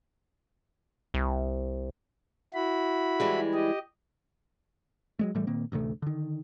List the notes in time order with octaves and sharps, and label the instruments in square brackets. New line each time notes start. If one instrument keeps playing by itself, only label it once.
[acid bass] C2
[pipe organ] E4 F#4 B5
[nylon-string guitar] E3 G3 G#3
[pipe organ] G4 D#5
[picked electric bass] F#3 G#3 A3
A2 E3 G3 A3
A#2 D#3 A#3 C4
A1 D2 C3 A3
D3 D#3